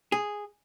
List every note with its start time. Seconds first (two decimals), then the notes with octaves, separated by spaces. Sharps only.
0.12 G#4